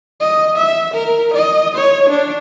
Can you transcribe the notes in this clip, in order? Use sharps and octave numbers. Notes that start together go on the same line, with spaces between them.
D#5
E5
A#4
D#5
C#5
D4